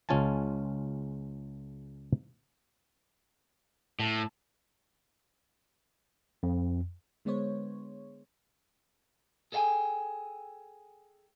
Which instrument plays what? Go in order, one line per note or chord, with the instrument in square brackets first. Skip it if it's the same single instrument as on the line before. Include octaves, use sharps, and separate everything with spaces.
[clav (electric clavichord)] C#2 G#3 C#4 F4 G#5 A5
[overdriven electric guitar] A2
[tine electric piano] F2
[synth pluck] D3 G#3 B3 C5 C#5
[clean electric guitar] G#4 A4 D5 F5 G5 G#5